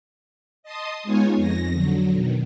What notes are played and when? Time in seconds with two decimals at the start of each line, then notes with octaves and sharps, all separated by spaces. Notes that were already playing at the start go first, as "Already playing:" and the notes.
0.63 D#5 A5 C6 D#6
1.03 G#3 B3 D#4 F4 C#5 G#5
1.36 F2 A#6
1.73 D3 F#3
2.12 B2 D#3